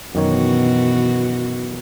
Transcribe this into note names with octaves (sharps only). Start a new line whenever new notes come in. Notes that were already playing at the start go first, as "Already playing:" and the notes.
F#2 B2 D#3 E3 F#4 C#5